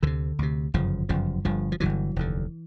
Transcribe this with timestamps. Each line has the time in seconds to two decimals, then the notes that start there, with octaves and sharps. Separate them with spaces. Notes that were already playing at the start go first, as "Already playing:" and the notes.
0.02 D2 D3 E3
0.07 C3
0.39 D2 C3
0.74 G1 F#2 C#3 F3
1.09 G1 F#2 C#3 F3
1.45 G1 G2 D3 F3
1.72 F3
1.80 G1 G2 D3 E3 F#3
2.16 F1 D#2 D3